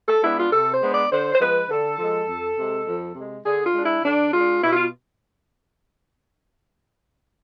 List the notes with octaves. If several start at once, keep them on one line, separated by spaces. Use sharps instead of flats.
A4
G#3 B3 D4 E4
F4
C3 A4
C5
G#3 B3 D4
D5
D3 C5
C5
F3 G#3 B4
D3 A4
F3 G#3
F2
C3 G#3
F2
C3 G#3
D3 G#4
F4
G#3 D4
E4
D3 D4
G#3 D4 F4
B2 E4
F4